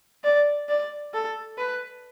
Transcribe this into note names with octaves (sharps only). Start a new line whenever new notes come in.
D5
D5
A4
B4